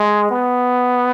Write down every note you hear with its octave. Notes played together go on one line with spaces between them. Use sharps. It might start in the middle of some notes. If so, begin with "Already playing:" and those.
Already playing: G#3
B3